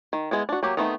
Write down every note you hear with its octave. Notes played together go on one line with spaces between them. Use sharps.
D#3
G#3 B3 E4
D4 F#4
F#3 A#3 G4
D#3 A3 B3 C4 D#4